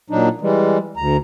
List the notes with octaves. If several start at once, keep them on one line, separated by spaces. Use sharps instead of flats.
A#2 F#3 D4 D#4
E3 G3 G#3
D2 A#5